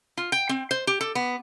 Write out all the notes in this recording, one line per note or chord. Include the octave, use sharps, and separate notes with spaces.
F4
G5
C4
C5
G4
A4
B3